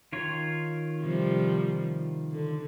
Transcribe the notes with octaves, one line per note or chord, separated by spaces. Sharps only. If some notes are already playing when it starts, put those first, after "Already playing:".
D#3 F4 C#5
C3 F3 G3
D3